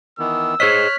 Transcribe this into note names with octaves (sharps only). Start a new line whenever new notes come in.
D#3 E3 B3 E6
G#4 C5 C#5 D#5 F6 F#6 B6